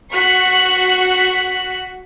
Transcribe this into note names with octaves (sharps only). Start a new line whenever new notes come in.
F#4 C#6 F#6 B6